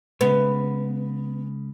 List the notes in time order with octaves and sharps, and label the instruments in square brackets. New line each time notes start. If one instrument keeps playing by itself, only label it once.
[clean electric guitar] C#3 G#3 [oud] B3